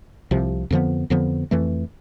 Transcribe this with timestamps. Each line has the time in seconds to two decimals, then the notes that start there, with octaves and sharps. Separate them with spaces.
0.31 C2 C3 F3
0.71 F2 D3 F3 B3
1.10 F2 D3 F3 B3
1.51 F2 E3 A3